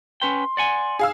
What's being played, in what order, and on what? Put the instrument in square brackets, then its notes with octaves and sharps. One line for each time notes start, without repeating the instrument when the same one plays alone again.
[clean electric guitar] C#4 B4 G5 [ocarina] C6
[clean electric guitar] D5 F#5 G#5
[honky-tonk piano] G#4 F5 E6